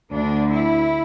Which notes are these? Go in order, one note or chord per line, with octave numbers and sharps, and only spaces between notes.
D2 D3 D4
E4